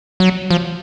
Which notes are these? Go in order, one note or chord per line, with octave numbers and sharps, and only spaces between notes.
F#3
F3